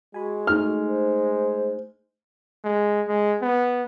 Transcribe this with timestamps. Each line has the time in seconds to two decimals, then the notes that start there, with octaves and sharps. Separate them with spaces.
0.14 G#3 F#4 G#5 B5
0.47 A3 D#4 D#5 F6
0.88 C5
2.64 G#3
3.08 G#3
3.42 B3